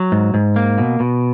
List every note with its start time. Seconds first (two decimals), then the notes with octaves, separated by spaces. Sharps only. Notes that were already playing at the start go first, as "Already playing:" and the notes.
Already playing: F#3
0.12 G#2
0.34 G#2
0.56 A#3
0.78 B2
1.00 B2